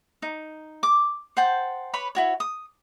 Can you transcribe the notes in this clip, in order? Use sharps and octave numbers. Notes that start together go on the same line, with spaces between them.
D#4
D6
C5 F#5 G5 A5
B4 C#5 B5
E4 F#4 C#5
D#6